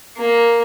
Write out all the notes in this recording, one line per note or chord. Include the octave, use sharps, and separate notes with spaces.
A#3